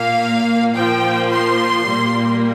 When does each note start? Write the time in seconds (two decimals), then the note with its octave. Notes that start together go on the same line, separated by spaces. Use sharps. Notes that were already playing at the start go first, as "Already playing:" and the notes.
Already playing: A#2 A#3 F5
0.75 A#2 F3 A#3 G5
1.31 C6
1.86 A#2 G3 A#3